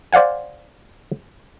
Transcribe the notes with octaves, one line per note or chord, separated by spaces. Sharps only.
C5 D5 F5 F#5 G#5